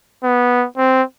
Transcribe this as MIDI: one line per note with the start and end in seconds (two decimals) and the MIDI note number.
0.24 0.66 59
0.77 1.02 60